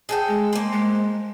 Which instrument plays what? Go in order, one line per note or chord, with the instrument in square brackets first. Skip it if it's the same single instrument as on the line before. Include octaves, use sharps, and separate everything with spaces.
[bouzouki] G#4 A4 G5
[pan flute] G#3
[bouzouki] A#3 C5
[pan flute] G#3